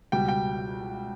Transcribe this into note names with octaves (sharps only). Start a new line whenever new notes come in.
C#2 B2 G3 G5
G5